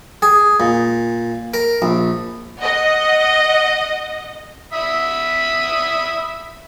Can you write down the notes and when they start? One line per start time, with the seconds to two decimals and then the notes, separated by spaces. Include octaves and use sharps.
0.22 G#4
0.60 A#2
1.54 A#4
1.82 A#1
2.60 D#5 F#5
4.73 E5 B5 D#6